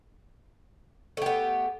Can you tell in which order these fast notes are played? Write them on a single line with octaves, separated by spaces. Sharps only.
A3 G4 B3